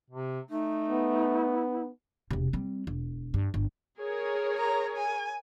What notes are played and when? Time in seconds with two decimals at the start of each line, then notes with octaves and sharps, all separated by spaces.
0.10 C3
0.49 A3 D#4
0.90 B3
2.31 E1 C3
2.53 G3 C4
2.87 E1
3.34 G2
3.54 G1
3.99 G#4 A#4 C#5
4.58 A#5
4.97 G#5